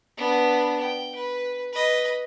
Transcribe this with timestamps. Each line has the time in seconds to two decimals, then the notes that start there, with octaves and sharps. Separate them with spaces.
0.17 B3 D4
0.81 G5
1.15 B4
1.73 B4 D#5